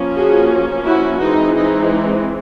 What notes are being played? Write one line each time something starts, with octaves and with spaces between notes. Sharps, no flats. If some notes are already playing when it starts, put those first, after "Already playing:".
Already playing: F3 A#3 C#4
F#4 G#4
E4 F#4
E3 G#3 C4 D#4
D#4